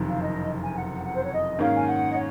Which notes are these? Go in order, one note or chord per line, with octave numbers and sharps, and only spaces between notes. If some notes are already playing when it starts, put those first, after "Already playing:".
Already playing: F#1 F2 C3 D#3
F5
D#5
G#5
F#5
F#5
F#5
C5
C#5
D#5
G#2 D#3 A#3 C#4 F5
G#5
F#5
D#5
C#5